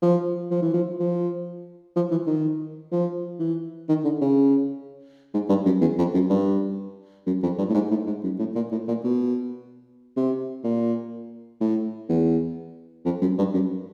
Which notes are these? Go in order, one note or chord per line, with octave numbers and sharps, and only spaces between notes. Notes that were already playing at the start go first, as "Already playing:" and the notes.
F3
F3
E3
F3
F3
F3
E3
D#3
F3
E3
D#3
D3
C#3
G#2
G2
F#2
E2
F2
F#2
G2
F#2
F2
G2
A2
G#2
A2
G#2
F#2
A2
A#2
A2
A#2
B2
C3
A#2
A2
E2
F2
F#2
G2
F#2